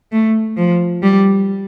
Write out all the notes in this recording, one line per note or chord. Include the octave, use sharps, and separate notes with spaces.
A3
F3
G3